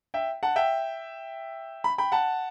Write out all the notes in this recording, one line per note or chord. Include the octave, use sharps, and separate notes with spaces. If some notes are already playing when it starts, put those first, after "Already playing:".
E5 G5
F#5 A5
E5 G5
B5
G5 B5
F#5 A5